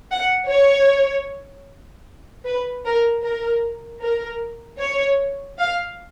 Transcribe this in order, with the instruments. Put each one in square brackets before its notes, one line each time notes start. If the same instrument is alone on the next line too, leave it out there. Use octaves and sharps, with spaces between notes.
[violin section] F#5
C#5
B4
A#4
A#4
A#4
C#5
F5